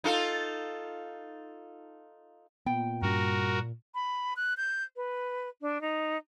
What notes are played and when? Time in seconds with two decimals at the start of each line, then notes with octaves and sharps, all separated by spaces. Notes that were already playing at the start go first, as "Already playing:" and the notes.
0.04 D#4 F4 A4
2.66 A#2 B3 G5
3.02 G2 G3 C#4 F#4 A#4
3.95 B5
4.36 F#6
4.57 G6
4.96 B4
5.62 D4
5.81 D#4